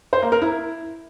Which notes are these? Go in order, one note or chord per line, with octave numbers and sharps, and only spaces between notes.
C5
A#3
A#4
E4